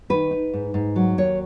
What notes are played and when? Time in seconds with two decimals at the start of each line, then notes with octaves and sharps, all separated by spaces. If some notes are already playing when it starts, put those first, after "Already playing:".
0.10 D#3 B4
0.31 D#4
0.53 G#2
0.74 G#2
0.96 F#3
1.18 D#2 C#5